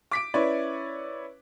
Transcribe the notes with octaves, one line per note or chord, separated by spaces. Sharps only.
D6 B6 D7
C#4 E4 B4 C#5 D5